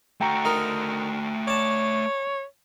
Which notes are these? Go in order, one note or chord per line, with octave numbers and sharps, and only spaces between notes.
A3 F#4 G5 A#5 C#6
D#4 A#4
C#5 D5 A5